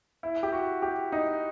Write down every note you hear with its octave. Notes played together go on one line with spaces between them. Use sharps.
E4
G4
F#4
G4
D#4